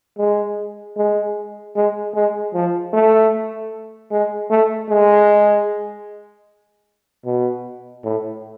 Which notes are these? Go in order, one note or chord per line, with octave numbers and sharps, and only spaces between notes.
G#3
G#3
G#3
G#3
F3
A3
G#3
A3
G#3
B2
A2